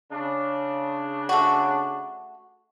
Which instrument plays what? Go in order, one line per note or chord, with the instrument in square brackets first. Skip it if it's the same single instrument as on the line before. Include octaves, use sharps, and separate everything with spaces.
[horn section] C#3 D4
[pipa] A3 F#4